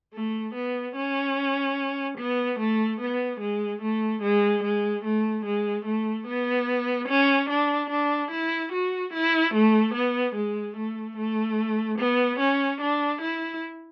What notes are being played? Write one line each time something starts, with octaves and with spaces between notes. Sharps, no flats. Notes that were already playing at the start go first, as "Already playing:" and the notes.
A3
B3
C#4
B3
A3
B3
G#3
A3
G#3
G#3
A3
G#3
A3
B3
C#4
D4
D4
E4
F#4
E4
A3
B3
G#3
A3
A3
B3
C#4
D4
E4